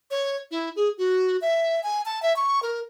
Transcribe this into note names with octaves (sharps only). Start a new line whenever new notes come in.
C#5
E4
G#4
F#4
E5
G#5
A5
E5
C#6
A#4